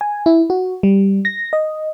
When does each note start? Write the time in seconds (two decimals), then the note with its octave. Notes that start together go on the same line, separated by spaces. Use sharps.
0.01 G#5
0.26 E4
0.50 F#4
0.83 G3
1.25 A#6
1.53 D#5